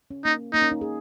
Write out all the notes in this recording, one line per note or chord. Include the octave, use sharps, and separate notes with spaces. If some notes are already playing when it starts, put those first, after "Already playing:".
C#4
A#3 D#4
A#3 D#4
C#4
D#4
G#4